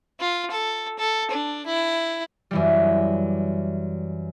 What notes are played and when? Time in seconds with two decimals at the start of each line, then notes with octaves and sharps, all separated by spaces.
0.20 F4
0.50 A4
0.99 A4
1.31 D4
1.66 E4
2.51 F#2 E3 G3